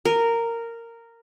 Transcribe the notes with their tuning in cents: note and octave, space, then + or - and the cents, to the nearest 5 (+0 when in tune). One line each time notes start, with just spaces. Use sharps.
A#4 -10